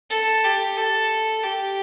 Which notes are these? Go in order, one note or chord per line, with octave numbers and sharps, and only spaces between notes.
A4
G4
A4
G4